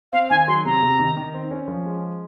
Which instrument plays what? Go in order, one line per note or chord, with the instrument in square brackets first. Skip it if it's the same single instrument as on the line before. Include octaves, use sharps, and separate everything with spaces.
[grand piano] C4 [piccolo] F5
[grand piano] D#3 [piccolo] G#5
[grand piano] F#3 [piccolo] C6
[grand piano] C3 [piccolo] A#5
[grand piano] C3
D#3
D#3
C4
C#4
F3
G#3